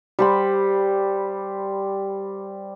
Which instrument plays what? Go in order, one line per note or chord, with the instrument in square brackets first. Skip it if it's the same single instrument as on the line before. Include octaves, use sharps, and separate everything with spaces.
[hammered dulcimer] G3 C5 B5